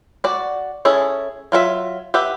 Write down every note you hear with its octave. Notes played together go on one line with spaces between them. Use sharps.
F#4 D5
C#4 E4 G#4 A4
F#3 F4 A#4 E5
G4 B4 E5 F#5